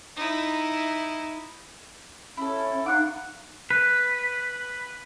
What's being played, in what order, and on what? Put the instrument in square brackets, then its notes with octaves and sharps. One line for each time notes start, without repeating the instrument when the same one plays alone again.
[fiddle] D#4 E4
[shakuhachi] C#4 [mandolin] E4 A4
[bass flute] D#4 [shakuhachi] F5 [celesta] F#5 F#6 [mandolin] C#6 D6
[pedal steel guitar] B4